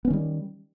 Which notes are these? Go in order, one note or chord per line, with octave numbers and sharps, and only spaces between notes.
D#3 G3 B3 C#4